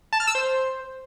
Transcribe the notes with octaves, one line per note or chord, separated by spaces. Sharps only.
A5
F6
E6
C5